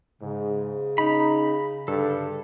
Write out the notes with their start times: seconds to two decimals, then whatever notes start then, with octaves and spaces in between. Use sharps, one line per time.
0.22 G#2 C#3
0.98 C#4 D#4 A#5 B5
1.88 G2 D3 A4